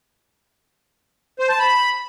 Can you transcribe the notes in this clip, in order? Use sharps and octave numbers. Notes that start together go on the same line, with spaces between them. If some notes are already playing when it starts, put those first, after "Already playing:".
C5
A5
B5